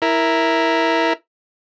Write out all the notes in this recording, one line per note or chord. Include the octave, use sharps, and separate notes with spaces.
E4 A#4